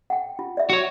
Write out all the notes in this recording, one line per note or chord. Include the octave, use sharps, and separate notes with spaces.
F#5 G5
F4
D5 E5
F#4 C#5